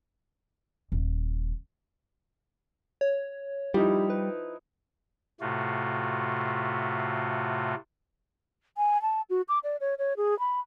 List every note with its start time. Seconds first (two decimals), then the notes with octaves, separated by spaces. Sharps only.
0.92 D#1
3.01 C#5
3.74 F3 G3 D#4 E4 G4
4.10 B4
5.41 A2 C3 A3 F4 F#4
8.77 G#5
9.02 A5
9.30 F#4
9.48 D6
9.64 D5
9.80 C#5
9.98 C#5
10.17 G#4
10.39 B5